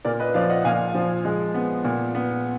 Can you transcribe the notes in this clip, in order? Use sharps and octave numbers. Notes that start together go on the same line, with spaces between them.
A#2 A#4 D5
B4 D#5
F3 D5 F5
D#5 F#5
A#2 F5 G#5
F3
G#3
B3
A#2
B3